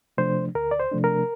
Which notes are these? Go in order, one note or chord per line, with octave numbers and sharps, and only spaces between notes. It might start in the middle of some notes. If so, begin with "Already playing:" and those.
C3 F3 A3 D4 C5
D2 A#4
D5
C5
C3 F3 A3 D4
A#4